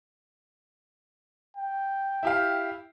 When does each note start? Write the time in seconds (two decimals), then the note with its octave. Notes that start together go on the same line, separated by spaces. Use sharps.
1.57 G5
2.23 E4 G4 F5